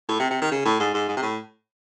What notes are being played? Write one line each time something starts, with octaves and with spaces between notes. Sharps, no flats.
A2
C3
C3
D#3
C#3
A2
G#2
G#2
G#2
C3
A2